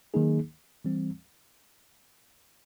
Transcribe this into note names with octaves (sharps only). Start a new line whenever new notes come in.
D#3 F#3 A#3 D#4 G#4
E3 G3 C4